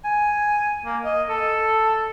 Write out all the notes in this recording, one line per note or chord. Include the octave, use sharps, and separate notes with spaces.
G#5
A#3
D#5
A4